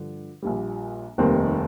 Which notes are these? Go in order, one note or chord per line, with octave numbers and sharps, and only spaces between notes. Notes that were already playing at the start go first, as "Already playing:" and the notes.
Already playing: G2 D3 F3
A#1 A#2 G3
F1 D#2 D#3 G3 C4